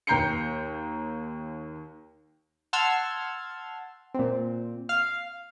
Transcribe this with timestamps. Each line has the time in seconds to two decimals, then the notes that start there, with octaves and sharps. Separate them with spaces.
0.07 D#2 G5 A#5 G6 C7 C#7
2.73 F#5 A5 C6 E6 F6 G#6
4.14 A#2 C4
4.89 F5